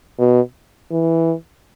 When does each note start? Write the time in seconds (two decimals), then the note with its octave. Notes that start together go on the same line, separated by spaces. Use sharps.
0.19 B2
0.91 E3